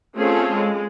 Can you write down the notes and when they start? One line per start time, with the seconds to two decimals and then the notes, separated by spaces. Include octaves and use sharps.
0.16 A3 C4 C#4 F4 G#4 A4
0.53 G#3